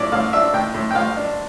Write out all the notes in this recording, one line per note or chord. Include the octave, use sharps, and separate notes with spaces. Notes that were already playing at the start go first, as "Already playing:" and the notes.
Already playing: A2 D5
A2 F5
D4 E5
A2 G5
A2
G5
A2 F5
D4